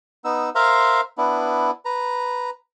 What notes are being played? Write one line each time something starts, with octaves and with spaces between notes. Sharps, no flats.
B3 D#4 E6
A#4 C5 E5 F5 A#5 C6
B3 D4 E4
B4 A#5